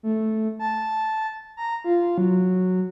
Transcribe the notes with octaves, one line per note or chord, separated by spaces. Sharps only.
A3
A5
A#5
F4
F#3